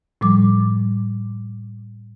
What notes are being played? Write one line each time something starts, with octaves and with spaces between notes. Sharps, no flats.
A2 F3 G3 D6